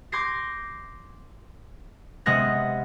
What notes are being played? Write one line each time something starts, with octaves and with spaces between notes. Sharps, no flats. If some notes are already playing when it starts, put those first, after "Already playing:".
C6 D6 G6 G#6 A#6 C7
C3 G#3 B3 C#4 F#6 A#6